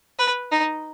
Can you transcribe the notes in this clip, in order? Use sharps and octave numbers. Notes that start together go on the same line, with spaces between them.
B4
D#4